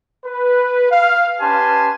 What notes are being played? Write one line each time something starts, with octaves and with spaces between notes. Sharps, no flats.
B4
F5
C#4 G4 B4 G#5 A5 C6